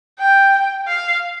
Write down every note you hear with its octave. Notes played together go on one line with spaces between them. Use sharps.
G5
F5